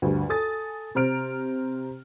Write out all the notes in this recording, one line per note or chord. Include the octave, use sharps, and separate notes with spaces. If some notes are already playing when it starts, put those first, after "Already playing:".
D2 G2
A4 G#5 D#6 A6
C3 C5 A#5 F6 D7